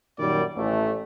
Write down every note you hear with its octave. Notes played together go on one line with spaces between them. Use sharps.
F#2 A#2 D#3 G3 F#4 D5
A1 A3